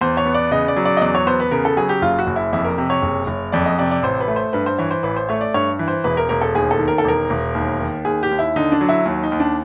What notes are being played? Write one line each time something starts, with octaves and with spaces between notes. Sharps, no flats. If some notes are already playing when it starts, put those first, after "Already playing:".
E2 C5
C#5
B3
D5
C#3 D#5
D5
F#3
D5
D#5
E2 D5
C#5
B3 C5
B4
C#3 A#4
A4
F#3 G#4
G4
F#1 F4
F#4
F#1
E4
F2 E4
A#4
C3
C#5
F#1
F#1
F2 D5
D#5
C3 D5
D5
A1 C5
B4
A3
C5
G2 B4
C5
E3 C#5
C5
A1 B4
C5
A3 C#5
D5
G2 C#5
E3
C5
E1 B4
A#4
E1 A#4
A4
D#2 G#4
A4
D#3
A#4
A4
E1 A#4
E1
D#2
D#3
D#2 G#4
G4
D#2
E4
D3 D#4
D4
F#3
E4
D#2
D#4
D#2
D4